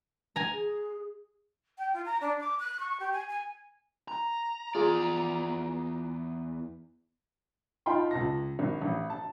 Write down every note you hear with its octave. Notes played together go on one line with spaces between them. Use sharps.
G#5 A#5
G#4
G5
F4
A#5
D4
D6
F#6
C#6
G4
G#5
G#5
A#5
E2 F3 F4 G#4 D5
D#4 F4 G5 A5 B5 C6
C#2 A5 A#6
G#1
A1
A5